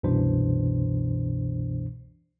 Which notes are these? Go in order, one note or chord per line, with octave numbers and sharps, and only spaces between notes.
C2 F#2 B2 E3 D4 C5